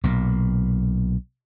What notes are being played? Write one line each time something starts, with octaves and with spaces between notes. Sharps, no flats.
B1 A#2